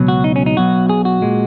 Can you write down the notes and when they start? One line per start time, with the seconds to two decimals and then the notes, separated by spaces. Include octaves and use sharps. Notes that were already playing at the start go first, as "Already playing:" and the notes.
Already playing: C#2 B2 F#3
0.08 F#4
0.24 D#4
0.36 C#4
0.46 D#4
0.57 B1 B2 F#3 F#4
0.89 G#4
1.05 F#4
1.22 A#2 G#3